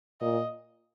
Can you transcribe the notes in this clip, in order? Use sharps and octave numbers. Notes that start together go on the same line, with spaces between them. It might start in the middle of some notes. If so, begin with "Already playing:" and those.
A#2 D#5